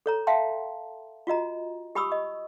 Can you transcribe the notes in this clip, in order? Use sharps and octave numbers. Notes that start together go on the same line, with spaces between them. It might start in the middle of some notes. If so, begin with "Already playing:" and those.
A4 C#5 A#5
E5 F5 G5 A5 C6
F4 F#4 D#5 A#5
G4 G#5 B5 C#6 D#6 E6
D#5